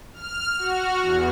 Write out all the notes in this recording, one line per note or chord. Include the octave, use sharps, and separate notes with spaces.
F6
F#4
E2